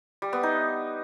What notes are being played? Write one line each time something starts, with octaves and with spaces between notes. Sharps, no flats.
G3
B3
D#4